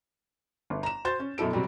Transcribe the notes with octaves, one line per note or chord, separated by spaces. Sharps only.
G1
A#5 E7
F#4 C5 C6 G6 A6 E7
C#4
F#2 B2 E4 A4 D7
C3 F#3 G3